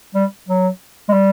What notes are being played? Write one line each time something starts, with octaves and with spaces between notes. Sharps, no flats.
G3
F#3
G#3
G3